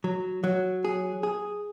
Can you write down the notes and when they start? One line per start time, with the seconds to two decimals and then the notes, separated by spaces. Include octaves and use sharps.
0.04 F#3
0.44 F#3
0.84 G#4
1.23 G#4